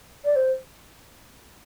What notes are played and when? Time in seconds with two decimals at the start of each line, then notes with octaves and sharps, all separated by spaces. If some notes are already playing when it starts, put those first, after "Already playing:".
0.24 D5
0.36 C5